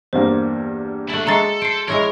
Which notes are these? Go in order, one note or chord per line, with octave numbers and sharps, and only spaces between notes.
E2 G2 A#3 C5
A3 E4 F#5 A5
G#3 F#4 A4 E5 A#5 A6 C7
C5 C7 D7
G#3 E4 A#4 C#5